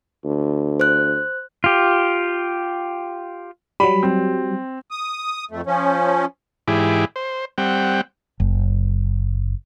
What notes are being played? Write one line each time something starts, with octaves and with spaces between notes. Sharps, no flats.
D2
C5 F#6
F4 G4
F#3 G3 B5
C4
D#6
F2 A3
F3 C#4
G#2 E3 E4 G4 G#4 D6
C5
G3 C4 F#5 G5
F#1